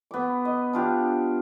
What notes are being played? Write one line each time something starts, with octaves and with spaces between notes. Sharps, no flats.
B3 D6
D#5
D4 F4 G4